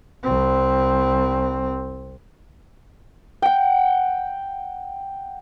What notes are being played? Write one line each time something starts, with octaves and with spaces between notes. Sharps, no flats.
C2 C4
F#5 G5